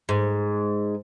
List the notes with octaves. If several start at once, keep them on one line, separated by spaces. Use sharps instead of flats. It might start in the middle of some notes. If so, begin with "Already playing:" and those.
G#2